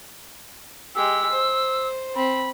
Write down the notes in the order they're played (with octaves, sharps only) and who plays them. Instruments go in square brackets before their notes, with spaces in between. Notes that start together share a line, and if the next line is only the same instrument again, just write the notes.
[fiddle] G#3 G4 [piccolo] E6
[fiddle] C5
[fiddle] C4 [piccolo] B5